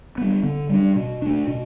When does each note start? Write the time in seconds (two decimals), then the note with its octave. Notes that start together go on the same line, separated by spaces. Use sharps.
0.18 G3 B3
0.43 D3
0.69 G3 B3 D4
0.96 B2
1.22 A3 D4
1.47 B2